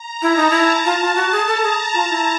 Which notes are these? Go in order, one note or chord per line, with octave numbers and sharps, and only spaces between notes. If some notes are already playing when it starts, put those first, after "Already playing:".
Already playing: A#5
E4 A5
D#4
E4
F4
F4
F#4
G#4
A4 A#5
G#4
F4
E4